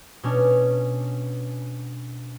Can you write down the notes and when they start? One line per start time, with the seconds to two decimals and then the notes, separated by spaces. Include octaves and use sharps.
0.23 B2 C#4 D4